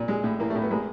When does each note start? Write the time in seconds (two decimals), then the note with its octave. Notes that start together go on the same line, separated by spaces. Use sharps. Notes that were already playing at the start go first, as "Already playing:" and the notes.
Already playing: A#2
0.08 G#3
0.24 A2
0.40 E3 A#3
0.50 A3
0.55 A2
0.62 B3
0.71 G#3 A#3